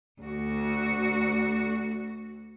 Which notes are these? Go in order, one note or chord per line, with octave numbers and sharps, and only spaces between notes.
D2 F#4